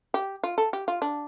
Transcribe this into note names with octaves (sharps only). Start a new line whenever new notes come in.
G4
F4
A4
G4
F4
D4